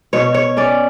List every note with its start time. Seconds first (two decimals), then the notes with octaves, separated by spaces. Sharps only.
0.13 B2 C#5
0.34 C#5
0.57 C#4 D5